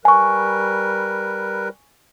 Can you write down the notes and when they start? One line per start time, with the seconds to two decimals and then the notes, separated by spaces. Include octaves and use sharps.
0.05 G3 A#4 B4 G#5 C#6